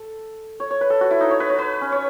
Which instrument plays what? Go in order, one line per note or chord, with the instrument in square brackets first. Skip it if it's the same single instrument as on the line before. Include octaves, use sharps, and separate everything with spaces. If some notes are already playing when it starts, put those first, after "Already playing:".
Already playing: [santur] A4
C#5
C#5
B4
A4
F#4
E4
D#4
C#5
B4
C#5
B4
C#4
C#5